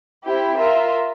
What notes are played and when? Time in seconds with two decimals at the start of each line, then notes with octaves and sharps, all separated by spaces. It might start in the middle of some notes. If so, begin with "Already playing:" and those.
0.24 C4 E4 G4
0.58 F4 A#4 E5